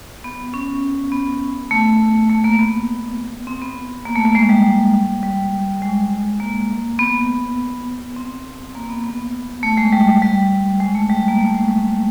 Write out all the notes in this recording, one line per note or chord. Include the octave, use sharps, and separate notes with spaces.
B3
C#4
B3
A3
A3
A#3
B3
C4
B3
A#3
A3
A#3
G#3
G3
G3
G#3
A#3
B3
C4
A#3
B3
B3
A3
G#3
G3
G3
G#3
A3
G3
A#3
A3
G#3
G3